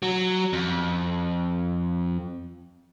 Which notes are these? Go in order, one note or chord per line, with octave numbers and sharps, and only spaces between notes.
F#3
F2